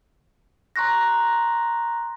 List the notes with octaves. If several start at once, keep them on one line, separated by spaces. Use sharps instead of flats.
A#5 C6 C#6 F#6 A#6